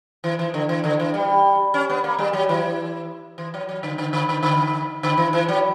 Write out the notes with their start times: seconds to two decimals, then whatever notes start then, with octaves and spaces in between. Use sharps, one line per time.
0.24 E3
0.39 E3
0.54 D3
0.69 E3
0.84 D3
1.00 E3
1.14 G3
1.74 C#4
1.90 B3
2.04 A#3
2.19 G3
2.33 F#3
2.49 E3
3.38 E3
3.54 F#3
3.69 F#3
3.83 D3
3.98 D3
4.13 D3
4.29 D3
4.43 D3
5.03 D3
5.17 E3
5.33 E3
5.48 F#3